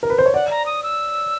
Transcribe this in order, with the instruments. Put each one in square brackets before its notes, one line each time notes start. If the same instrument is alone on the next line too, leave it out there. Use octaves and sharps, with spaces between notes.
[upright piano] A#4
B4
C5
C#5
[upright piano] D5 [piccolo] F#5
[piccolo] A#5
D#6
E6